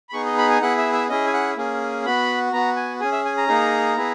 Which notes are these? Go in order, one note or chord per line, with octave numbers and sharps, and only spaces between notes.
B5
B3 D#4 G#4 C#6
D#5
B5
G#5
B3 E4 G#4 F#5
E5
E5
C#4 E4 G#4 D#5
G#5
F#5
A#3 C#4 G#4
B3 F#4 B5
B3 F#4 A#5
G#5
C#4 G#4 G#5
E5
G#5
A#5
A#3 D#4 G#4
B3 E4 G#4